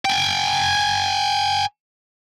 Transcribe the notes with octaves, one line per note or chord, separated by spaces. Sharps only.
G5 G#5